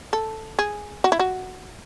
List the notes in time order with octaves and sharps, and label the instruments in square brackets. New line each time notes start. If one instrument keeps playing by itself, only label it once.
[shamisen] A4
G#4
F#4
E4
F#4